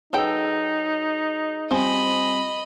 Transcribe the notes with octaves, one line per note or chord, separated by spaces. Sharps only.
F#3 D#4 G#4 A4 B4 G5 E6
F3 G3 C4 C5 D#5 G#5 B5